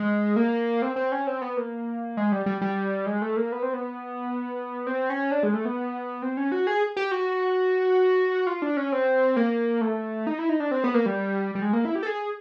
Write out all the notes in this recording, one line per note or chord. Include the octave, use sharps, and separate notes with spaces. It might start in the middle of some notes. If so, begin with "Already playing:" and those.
Already playing: G#3
A#3
C4
C4
C#4
C4
B3
A#3
G#3
G3
G3
G3
G#3
A3
A#3
B3
C4
B3
C4
C#4
D4
G#3
A3
B3
C4
C#4
F#4
G#4
G4
F#4
F4
D4
C#4
C4
A#3
A3
D#4
E4
D#4
D4
C4
B3
A#3
G3
G3
G#3
A#3
E4
G4
A4
G#4